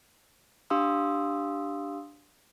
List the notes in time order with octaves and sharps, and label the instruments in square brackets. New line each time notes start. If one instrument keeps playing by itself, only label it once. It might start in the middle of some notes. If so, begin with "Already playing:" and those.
[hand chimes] D4 G4 F5 C6 D#6 E6